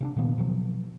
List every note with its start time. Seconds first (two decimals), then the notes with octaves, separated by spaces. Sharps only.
0.01 C3 C#4 D4
0.17 A#2 D#3 A#3 B3
0.38 B2 F3 F#3